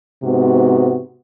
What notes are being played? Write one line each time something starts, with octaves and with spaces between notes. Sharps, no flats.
G#2 C3 B3 F#4